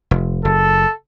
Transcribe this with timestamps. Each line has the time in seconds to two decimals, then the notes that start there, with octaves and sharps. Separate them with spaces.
0.11 F1
0.45 F#1 A4